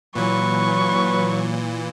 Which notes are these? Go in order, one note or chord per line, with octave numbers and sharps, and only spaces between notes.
A#2 E3 F#3 B4 C#6